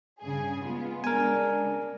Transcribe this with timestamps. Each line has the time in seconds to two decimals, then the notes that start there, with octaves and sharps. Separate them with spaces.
0.21 G2 C#3 G#4
0.64 G#3 B3 F4
1.04 C#3 G#3 D4 A#4 G#5